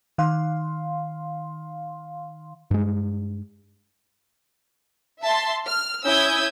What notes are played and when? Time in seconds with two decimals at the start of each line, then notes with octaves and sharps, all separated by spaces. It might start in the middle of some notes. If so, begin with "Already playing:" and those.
0.18 D#3 F5 C6
2.71 G2 G#3
5.22 E5 A5 C6
5.65 F6
6.03 C#4 E4 D#6 E6 G6 G#6